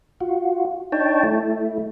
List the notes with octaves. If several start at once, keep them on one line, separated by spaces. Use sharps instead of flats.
F4 F#4
D4 D#4 C#5 G5 A5
A3 E4